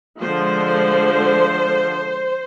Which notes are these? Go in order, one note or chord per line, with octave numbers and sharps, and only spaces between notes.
D3 F3 G#3 C5